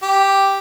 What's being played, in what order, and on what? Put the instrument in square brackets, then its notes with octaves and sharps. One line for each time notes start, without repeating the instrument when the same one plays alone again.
[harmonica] G4